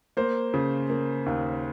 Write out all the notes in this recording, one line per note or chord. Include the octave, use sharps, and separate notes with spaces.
A#3 C5
C#3
A#3
D#2